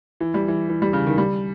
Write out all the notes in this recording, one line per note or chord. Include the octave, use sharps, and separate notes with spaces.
E3
G3
E3
E3
G3
C#3
D#3
G3